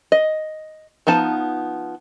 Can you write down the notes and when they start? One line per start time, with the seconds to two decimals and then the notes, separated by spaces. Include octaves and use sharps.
0.12 D#5
1.07 F3 B3 D#4 A5